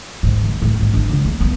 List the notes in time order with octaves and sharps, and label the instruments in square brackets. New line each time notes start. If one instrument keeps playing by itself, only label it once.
[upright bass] G#2
D#2
A2
G#1
D4
C#2
A#3
B3